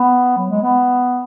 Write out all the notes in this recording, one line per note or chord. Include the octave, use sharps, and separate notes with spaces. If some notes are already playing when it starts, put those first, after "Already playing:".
Already playing: B3
F#3
G#3
B3